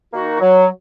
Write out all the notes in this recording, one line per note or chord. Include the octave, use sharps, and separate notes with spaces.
D#3 A#3 D#4 F#4
F#3